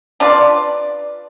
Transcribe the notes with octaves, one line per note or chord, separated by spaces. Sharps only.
D4 F4 B4 D5